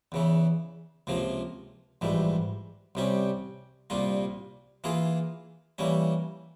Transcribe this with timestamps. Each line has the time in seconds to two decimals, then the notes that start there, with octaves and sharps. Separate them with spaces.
0.12 E2 C#3 E3
1.07 C#2 C3 F3 A#3
2.01 A#1 G#2 E3 G3
2.95 C2 C3 G3 C#4 G4
3.90 C2 A#2 G3 A#3 F4
4.84 E3 A#3 F4 G#4
5.78 E3 G3 A#3 C#4